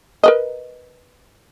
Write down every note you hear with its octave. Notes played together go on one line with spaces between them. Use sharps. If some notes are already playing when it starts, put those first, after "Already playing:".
A#4 B4 D#5